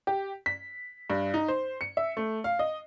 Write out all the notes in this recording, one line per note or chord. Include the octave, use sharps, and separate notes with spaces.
G4
B6
G2
D#4
C5
C#7
E5
A3
F5
D#5